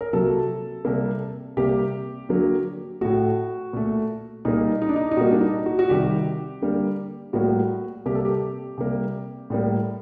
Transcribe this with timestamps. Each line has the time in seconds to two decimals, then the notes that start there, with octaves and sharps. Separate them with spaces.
0.01 A#4
0.13 C3 F#3 A#3 A4
0.85 C3 G3 A#3
1.57 C3 G3 A#3 G4
2.29 D3 F#3 A#3
3.01 A2 A3 F#4
3.73 A#2 A3
4.45 A#2 G3 A#3 D#4
4.82 D#4
4.89 D4
4.96 D#4
5.11 D#4
5.17 A#2 G3 A#3 F#4
5.31 D4
5.41 D#4
5.66 F#4
5.79 F#4
5.89 C3 D#3 G3 G4
6.62 D3 G3 A#3
7.33 A2 G3 A#3 F#4
8.06 C3 G3 A#3 G4
8.15 A4
8.25 G4
8.78 C3 G3 A#3
9.50 A2 G3 A#3